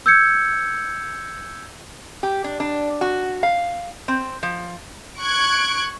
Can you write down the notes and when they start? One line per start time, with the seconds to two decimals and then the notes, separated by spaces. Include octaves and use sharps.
0.06 E6 G6 G#6 C#7
2.23 G4
2.44 D4
2.60 D4
3.01 F#4
3.43 F5
4.08 C4
4.43 F3
5.20 C#6 F#6 G#6 D7